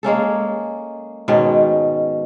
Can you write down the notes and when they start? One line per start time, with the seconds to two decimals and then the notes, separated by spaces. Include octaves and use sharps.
0.03 G#3 A#3 C#4 A4
1.28 G#2 B2 D#3 C#4